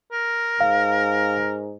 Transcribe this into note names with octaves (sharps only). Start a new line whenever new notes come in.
A#4
G#2 F5